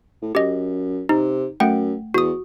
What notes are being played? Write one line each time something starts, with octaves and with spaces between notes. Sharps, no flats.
A2
F#2 G4 D#5
C3 D#4
F#2 A3 F#5 G5
E2 F#4 D#6